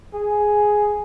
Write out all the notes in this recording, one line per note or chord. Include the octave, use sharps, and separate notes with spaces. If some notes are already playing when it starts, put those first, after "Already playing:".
G#4